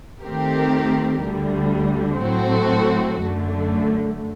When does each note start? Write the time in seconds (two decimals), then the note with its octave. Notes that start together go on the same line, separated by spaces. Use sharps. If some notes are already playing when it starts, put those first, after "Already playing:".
0.22 D#3 A3 C4 G4 A#4
1.21 D2 D3 G3
2.21 A2 F#3 C4 F#4 A4
3.21 F#2 D3 A3